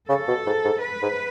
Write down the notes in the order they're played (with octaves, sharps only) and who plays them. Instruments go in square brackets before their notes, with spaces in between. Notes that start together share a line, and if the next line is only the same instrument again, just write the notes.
[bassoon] C#3 [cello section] A4
[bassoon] B2
G#2
G#2
[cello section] B4
[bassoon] G#2